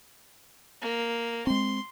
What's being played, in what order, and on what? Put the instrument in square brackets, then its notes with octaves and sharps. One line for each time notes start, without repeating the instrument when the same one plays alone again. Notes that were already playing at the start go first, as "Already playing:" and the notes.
[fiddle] A#3
[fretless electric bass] G#3 C4 [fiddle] C6